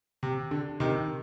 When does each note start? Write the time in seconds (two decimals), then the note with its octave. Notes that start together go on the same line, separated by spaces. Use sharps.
0.23 C3
0.51 D3
0.80 C3 D#3